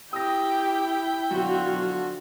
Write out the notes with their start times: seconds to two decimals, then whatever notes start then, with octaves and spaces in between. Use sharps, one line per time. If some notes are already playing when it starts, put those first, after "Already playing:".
0.13 E4 G4 G5 D#6 A#6
1.31 F#2 B2 D3 F3 F4 F#4